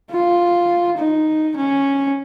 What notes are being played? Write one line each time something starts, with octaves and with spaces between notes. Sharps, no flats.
F4
D#4
C#4